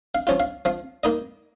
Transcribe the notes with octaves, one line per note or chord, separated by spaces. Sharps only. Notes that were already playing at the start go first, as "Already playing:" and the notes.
F5
F3 C#4 F4
F5
F3 F5
A#3 D#4 D#5